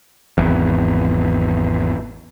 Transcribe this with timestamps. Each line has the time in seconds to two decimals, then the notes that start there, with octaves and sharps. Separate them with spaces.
0.38 G#1 E2